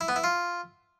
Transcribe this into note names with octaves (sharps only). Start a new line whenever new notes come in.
E4
B3
E4
F4